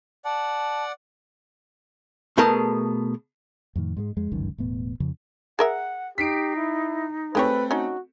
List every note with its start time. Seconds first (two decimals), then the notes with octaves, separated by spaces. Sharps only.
0.25 D5 F#5 A5
2.38 B2 A3 B3 G#4 A#4 A5
3.76 F2 A2 D#3
3.97 G#2 G3 G#3
4.17 F2 G#3
4.32 G1 C#2 F#2 D#3
4.58 E1 A2 B3
5.00 F2 C#3 F3
5.59 G#4 A#4 E5 F#5
6.18 D#4 G4 B6 C7 D7
6.56 E4
7.35 G#3 A3 C4 G4 A4 B4 C#5
7.71 C#4 D#4 F#4